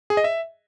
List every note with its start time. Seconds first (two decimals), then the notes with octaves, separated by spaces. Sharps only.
0.10 G#4
0.17 D#5
0.24 E5